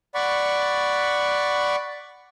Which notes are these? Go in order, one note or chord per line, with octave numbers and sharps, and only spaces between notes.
D5 F#5 B5 C#6